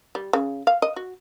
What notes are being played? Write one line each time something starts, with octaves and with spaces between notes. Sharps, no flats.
G3
C#3
F5
D#5
F#4